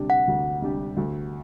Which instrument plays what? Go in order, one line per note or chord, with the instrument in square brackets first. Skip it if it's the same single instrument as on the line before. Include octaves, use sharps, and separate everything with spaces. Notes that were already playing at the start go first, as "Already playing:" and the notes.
Already playing: [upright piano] D2 C3 G3 D4 G4
[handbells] F#5
[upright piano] D2
C3 G3 D4 G4
D2